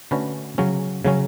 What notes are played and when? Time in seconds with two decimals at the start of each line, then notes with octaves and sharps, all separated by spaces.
0.11 D3 A3 C#4 F#4 B4
0.58 C#3 F#3 C#4
1.05 C#3 F#3 C#4